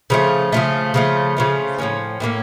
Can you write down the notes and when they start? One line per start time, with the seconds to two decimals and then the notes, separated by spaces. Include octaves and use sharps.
0.10 C#3 F3 A3
0.52 C#3 F3 A3
0.94 C#3 F3 A3
1.37 C#3 F3 A3
1.78 A2 F3 A#3 C#4
2.20 A2 F3 A#3 C#4